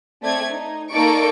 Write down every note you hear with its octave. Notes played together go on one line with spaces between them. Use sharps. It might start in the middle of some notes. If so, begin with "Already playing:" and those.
A3 C4 D5 G#6
D#4
A#3 D#4 A4 D5 C#6 D7